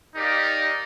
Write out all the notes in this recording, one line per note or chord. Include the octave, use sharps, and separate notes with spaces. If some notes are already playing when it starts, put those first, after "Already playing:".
D#4 G4 A#4 D5 F5